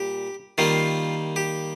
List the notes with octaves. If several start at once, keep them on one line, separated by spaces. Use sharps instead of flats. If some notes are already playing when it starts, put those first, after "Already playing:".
Already playing: A#2 G3 G4
D#3 G3 A#3 F4
G4